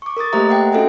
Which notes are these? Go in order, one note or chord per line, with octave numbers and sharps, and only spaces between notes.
C#6 D6
A#4 D6 D#6 A6
A3 A#3 G4 C5 E5 A#5
E5 F#5 G5
C#4 F#4 A4 D#5 E5 G#5